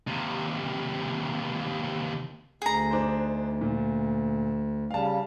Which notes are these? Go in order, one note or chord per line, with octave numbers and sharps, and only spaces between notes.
D#2 C3
D2 G#4 A#5
D4 D#4 C5
A#2
C#3 G3 F5 A5